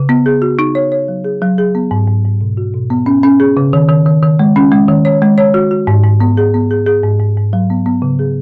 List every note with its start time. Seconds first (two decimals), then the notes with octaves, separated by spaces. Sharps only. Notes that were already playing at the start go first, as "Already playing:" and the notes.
Already playing: C#3
0.09 B3
0.26 G#4
0.42 F#4
0.59 D#4
0.75 C#5
0.92 C#5
1.08 F#3
1.25 G#4
1.42 F#3
1.58 G#4
1.75 B3
1.91 G#2
2.08 G#2
2.25 G#2
2.41 B2
2.57 F#4
2.74 B2
2.90 B3
3.06 C#4
3.23 C#4
3.40 G#4
3.57 C#3
3.73 D#3
3.89 D#3
4.06 D#3
4.22 D#3
4.39 G#3
4.56 C#4
4.72 G#3
4.89 D#3
5.05 C#5
5.22 G#3
5.38 C#5
5.54 F#4
5.71 F#4
5.87 G#2
6.04 G#2
6.20 B3
6.37 G#4
6.54 B3
6.71 G#4
6.86 G#4
7.04 G#2
7.20 G#2
7.37 G#2
7.53 F#3
7.70 B3
7.86 B3
8.02 C#3
8.19 G#4